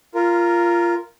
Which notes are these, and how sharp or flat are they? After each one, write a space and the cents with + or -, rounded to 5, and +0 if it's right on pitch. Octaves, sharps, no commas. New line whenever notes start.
F4 -15 A#4 +0